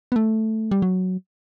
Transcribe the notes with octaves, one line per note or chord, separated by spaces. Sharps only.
B3
A3
G3
F#3